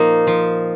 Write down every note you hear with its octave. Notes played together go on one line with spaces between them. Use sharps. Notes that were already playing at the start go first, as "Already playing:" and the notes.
Already playing: A#2 F3 A#3 D#4
F3